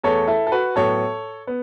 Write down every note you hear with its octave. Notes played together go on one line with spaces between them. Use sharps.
E2 E3 A3 A4 C#5
E4 A4
A4
F#4 B4
A2 F#3 B3 A4 C#5
B3